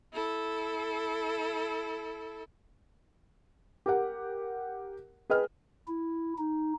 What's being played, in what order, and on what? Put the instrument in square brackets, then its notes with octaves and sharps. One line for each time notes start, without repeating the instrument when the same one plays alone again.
[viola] E4 A4
[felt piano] G4 A#4 F#5
G#4 B4 D#5 G5 F6
[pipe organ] E4
D#4